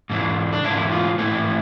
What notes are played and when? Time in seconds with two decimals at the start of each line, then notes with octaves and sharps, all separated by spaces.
0.10 G#2 E3 G#3
0.53 D4
0.64 G#2 E3 G#3 E4
0.91 F4
1.18 G#2 E3 A3 E4